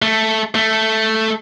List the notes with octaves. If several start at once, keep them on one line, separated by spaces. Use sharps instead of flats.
A3
A3